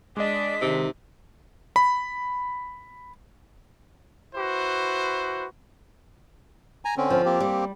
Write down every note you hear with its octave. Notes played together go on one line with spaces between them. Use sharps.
G#3 D4 D5 D#5 B6
C3 D#3
B5
E4 F#4 B4 C5
G#5 A#5
D3 C4 C#4
F3
A#3 C4 G4
G3